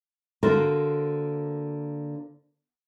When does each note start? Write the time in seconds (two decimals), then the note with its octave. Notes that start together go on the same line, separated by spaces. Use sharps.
0.43 D3 A#3 F#4 A#4 C5